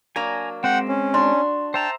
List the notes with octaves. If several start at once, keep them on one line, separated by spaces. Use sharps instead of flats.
F#3 A#3 D4 G#5 A#5
G#3 C4 F#5 G5
C#4
D4 F#4 C6
C5 E5 G5 A5 A#5